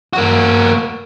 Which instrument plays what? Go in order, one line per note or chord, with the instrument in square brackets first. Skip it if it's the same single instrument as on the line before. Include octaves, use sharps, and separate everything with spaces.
[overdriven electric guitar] A#3 F#4